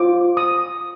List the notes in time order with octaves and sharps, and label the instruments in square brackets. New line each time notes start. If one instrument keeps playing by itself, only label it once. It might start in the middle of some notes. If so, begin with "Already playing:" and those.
Already playing: [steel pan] F4 C5 D6
D#6